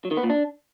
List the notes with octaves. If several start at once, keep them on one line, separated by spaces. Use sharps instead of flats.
F#3
D#3
B3
A#2
D4